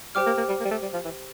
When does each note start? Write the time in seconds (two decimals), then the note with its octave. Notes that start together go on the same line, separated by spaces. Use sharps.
0.15 G3 G4 C5 G5 D6 F6
0.26 A#3
0.38 A#3
0.49 G3
0.60 A#3
0.65 G3
0.71 A3
0.82 G3
0.94 F3
1.04 E3